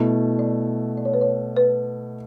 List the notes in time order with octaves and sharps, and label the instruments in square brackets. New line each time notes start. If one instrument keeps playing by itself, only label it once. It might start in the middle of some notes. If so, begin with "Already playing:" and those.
Already playing: [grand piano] B2 A3 E4
[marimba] D5
D5
C#5
B4
C#5
B4